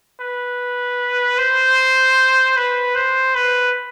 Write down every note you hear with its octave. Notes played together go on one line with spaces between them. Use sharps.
B4
C5
B4
C5
B4